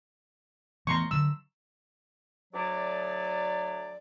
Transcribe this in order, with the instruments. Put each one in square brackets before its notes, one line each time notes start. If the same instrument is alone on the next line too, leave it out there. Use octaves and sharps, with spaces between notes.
[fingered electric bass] E3 A3 B3 [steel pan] A#5 C6 C#6
[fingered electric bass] D3 F#3 [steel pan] E6
[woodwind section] D2 F#3 D5